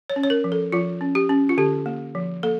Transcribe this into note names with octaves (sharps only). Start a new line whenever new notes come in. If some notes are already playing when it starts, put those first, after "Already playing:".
C#5
C#4
C#5
A#4
F3
A4
F3 F4
C#4
G4
C#4
F4
D3 G4
A#3
F3
A#3 A4